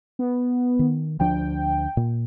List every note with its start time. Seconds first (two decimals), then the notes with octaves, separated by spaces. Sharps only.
0.19 B3
0.79 D#3
1.20 D2 F3 D4 G5
1.97 A#2